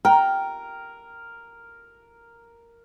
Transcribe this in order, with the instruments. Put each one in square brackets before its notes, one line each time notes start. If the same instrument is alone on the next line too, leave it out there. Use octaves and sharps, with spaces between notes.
[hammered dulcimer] A#4 [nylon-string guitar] G5